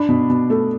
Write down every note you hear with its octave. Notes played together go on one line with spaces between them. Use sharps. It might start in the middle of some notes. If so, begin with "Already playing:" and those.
Already playing: D4 B5
B2
B2
A3